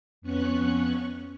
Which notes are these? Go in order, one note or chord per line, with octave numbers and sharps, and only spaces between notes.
F2 B3 C#4 C#6 F#6